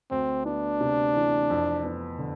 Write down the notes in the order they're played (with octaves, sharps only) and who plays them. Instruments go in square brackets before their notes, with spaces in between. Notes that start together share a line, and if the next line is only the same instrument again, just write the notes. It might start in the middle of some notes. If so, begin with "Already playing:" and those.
[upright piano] D2 [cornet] C4
[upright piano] B3 [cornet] D4
[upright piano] C3
E3
F2
B3
D3